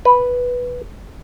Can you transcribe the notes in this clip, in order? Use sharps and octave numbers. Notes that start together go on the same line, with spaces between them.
B4